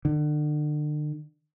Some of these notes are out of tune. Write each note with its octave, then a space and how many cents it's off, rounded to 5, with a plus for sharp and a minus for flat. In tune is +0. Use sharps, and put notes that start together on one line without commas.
D3 +35